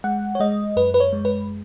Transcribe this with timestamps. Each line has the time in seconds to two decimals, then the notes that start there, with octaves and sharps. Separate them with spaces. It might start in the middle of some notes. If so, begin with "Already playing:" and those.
0.04 G#3 F#5
0.35 C#5
0.40 G#3 D#5
0.76 F#2 B4
0.94 B4
1.00 C#5
1.13 G#3
1.25 B4